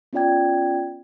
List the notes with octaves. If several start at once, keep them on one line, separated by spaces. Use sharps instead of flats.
B3 C#4 F4 D5 G5 G#6